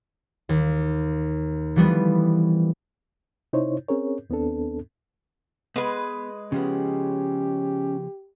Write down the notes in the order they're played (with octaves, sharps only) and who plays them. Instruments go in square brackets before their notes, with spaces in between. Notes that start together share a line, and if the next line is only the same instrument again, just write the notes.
[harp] D#2
E3 F3 G3 A3 B3
[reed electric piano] C3 D#4 E4 C5 C#5
C4 C#4 G#4 A#4 C#5
D#2 B3 C4 D4 A4
[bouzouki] G#3 B4 [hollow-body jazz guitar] B3
[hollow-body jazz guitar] C#3 F3 B3 [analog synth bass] C#4 [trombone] G4